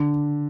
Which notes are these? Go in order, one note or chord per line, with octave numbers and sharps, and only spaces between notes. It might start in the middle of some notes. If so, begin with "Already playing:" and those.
Already playing: D3